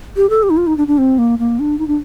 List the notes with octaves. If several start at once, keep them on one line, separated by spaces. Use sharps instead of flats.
G4
A4
G4
D#4
F4
D#4
D4
D4
C4
A#3
A#3
D4
D#4
D4